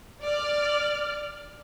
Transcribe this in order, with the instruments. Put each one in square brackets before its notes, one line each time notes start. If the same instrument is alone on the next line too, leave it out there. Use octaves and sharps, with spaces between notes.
[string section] D5 F6